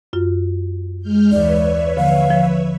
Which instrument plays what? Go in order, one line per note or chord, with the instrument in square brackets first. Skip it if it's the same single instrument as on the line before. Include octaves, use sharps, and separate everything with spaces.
[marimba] F#2 F4
[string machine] G#3 F6 G6
[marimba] D#2 E3 [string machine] B4 C#5 E5 [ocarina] D5
[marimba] D3 F3 A#3 [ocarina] F5
[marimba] F3